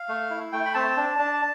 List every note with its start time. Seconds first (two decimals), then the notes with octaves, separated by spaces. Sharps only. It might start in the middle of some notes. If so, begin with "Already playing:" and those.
Already playing: F5
0.08 A3
0.30 E4
0.53 A3 G5
0.65 B5
0.74 C4 A5
0.97 D4
1.19 D4